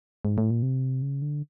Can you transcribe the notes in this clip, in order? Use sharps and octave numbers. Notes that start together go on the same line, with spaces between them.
G#2
A2
A#2
C3
C#3
D3